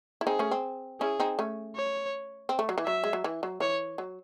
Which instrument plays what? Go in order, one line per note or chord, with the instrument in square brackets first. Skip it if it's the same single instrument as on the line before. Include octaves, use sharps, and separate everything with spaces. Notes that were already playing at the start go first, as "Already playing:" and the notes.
[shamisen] E4
[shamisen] C4 D#4 [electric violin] G#4
[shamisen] A3 C#4
C4
[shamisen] C#4 E4 [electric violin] G#4
[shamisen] C4 D#4
A3 C#4
[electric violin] C#5
[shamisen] C4
A3
F#3
E3
[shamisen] F#3 [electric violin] E5
[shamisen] G#3
F#3
E3
F#3
[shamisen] E3 [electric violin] C#5
[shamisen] F#3